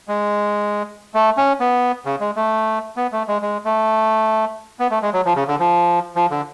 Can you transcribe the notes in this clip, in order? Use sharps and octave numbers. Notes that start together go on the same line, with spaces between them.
G#3
A3
C#4
B3
C#3
G#3
A3
B3
A3
G#3
G#3
A3
B3
A3
G#3
F#3
F3
C#3
D3
F3
F3
D3